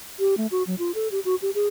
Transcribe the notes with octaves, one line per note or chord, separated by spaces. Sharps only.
G4
A3
F#4
F#3
F4
A4
G4
F#4
G4
G#4